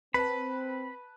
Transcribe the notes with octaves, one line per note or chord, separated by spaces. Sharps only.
C4 B4 A5 B5